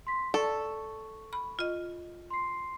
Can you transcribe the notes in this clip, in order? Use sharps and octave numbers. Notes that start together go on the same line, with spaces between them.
C6 B6
A4 D5 C#6
B5
F4 D#5
C6 C7